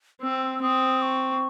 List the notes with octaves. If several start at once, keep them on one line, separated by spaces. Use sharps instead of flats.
C4 E6
E6
C4 D#6
C#6